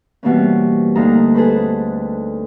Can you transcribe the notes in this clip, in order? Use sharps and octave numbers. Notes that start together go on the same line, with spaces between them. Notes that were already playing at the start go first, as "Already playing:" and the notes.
B2 E3 G3 A#3 C4 C#4
D2 A#3 D4 D#4 A#5
G#4 A4 B4 C5 B5